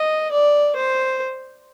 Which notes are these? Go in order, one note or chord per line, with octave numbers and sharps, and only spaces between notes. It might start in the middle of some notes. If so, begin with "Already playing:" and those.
Already playing: D#5
D5
C5